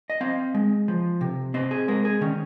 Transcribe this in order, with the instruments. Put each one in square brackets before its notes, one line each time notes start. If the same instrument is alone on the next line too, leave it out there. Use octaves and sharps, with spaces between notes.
[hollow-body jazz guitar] D#5
C4 F5
G#3
F3
C3
C4 D#5
G#4
G#3 A#4
G#4
D#3 C#4